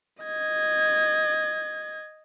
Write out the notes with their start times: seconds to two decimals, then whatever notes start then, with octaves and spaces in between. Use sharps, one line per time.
0.23 D#5 G#6